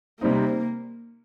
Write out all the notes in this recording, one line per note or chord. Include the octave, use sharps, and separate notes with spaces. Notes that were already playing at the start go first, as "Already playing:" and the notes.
C3 G3 A#3 C4 D#4